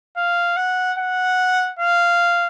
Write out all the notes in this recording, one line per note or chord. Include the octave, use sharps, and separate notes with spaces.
F5
F#5
F#5
F5